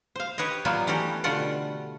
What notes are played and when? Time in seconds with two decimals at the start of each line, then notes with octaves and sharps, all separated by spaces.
0.16 C5 F5
0.38 G4 B4 C#5 D#5
0.65 F#3 G3 A#3 B3 F4
0.87 E3 A3 C#4 F#4 G4
1.24 B2 D3 G3 A3 F4 F#5